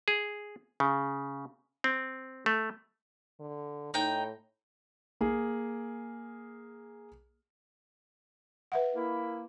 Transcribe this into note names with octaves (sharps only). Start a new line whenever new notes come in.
G#4
C#3
C4
A3
D3
A2 D#4 G5
A#3 G#4
B4 E5 F#5
A#3 E4